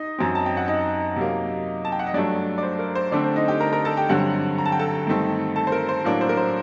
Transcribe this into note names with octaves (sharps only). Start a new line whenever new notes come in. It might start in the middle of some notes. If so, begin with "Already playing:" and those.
Already playing: D#4 D#5
F#2 F#3 C4
A5
G5
F#5
D#4 D#5
C3 F#3 A#3
A5
G5
F#5
D#5
G2 F#3 A3 D4 D5
D5
C5
A#4
C5
D3 A3 C4 D4 D5
C5
D#4 D#5
G4 G5
A#4 A#5
A#4 A#5
A4 A5
G4 G5
G2 D3 F#3 C4 F#4 F#5
A#5
A5
G5
A4 A5
G2 D#3 A3 C4
A4 A5
C5
A#4
C5
A2 F#3 A#3 D4
C5
A#4
C5